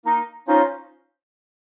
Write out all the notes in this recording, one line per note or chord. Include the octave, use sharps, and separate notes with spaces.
A#3 D#4
C#4 D#4 F4 C5